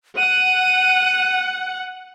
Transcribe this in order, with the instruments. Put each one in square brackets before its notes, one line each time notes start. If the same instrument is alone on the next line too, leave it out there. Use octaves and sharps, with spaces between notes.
[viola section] F#5 [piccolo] D#7